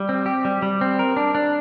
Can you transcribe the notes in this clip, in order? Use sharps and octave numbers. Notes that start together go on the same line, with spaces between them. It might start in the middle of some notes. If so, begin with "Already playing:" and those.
Already playing: G3
C4
G4
G3
G3
C4
A#4
D4
D4